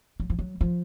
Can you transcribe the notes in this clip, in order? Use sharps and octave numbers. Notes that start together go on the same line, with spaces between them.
F#3
F3
F#3
F3